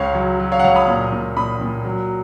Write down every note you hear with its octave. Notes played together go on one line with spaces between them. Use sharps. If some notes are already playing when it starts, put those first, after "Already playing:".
Already playing: C#2 C#5 F5
F#3
F#3
C#5 F5
F#5
C#2 C#5 F5
B5 D#6
A#2
A#2
A#2 B5 D#6
A#2
F#3